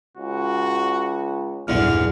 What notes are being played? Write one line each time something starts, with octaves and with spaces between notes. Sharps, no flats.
C#2 F#4
B1 E2 G2 A#2 D3 F6